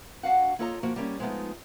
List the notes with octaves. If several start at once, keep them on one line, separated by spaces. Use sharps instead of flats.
D4 F#4 F5 F#5
A#3 F4 A4 C#5 D#5 A#5
F3 A#3 F#4
G3 A#3 C4 C#4
F3 G#3 A3 B3 D#4 F4